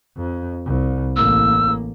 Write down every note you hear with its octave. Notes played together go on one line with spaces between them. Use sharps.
F2
C2
A1 A#3 E6